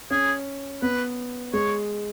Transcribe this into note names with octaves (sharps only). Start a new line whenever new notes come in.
C#4 G#4
B3 B4
G#3 C#5